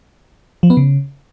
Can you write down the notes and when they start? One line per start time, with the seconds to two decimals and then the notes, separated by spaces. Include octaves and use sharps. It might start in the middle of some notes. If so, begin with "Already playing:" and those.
0.63 F3
0.70 B3
0.77 C#3